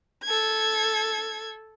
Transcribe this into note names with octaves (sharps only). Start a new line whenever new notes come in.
A4 G#6